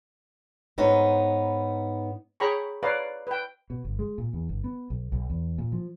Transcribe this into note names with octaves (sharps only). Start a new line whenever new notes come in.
G#2 B3 D#4 C#5
G#4 C#5 G5 A#5 B5 C#6
B4 C#5 D5 F5 A#5
B4 G5
B2
G1
G#3
A#2
E2
G1
B3
B1
B1
E2
A#2
F3